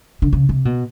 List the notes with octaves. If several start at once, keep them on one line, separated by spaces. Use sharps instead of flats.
D3
C#3
C3
B2